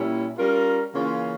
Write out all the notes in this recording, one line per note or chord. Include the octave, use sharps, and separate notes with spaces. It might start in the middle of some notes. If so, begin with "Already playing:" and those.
Already playing: A#2 G3 C#4 E4
G3 C#4 F4 A#4
C#3 E3 A#3 C#4 F4